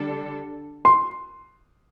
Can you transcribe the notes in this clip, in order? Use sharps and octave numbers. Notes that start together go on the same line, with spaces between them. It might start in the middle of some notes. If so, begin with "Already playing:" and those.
Already playing: D3 G3 D4 A4
C6